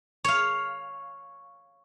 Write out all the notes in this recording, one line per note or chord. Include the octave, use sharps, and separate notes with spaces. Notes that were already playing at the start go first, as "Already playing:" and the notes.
C#5 F5